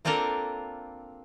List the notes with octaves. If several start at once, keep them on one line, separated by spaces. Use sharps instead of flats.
A#3 C4 D4 F4 A4 A#4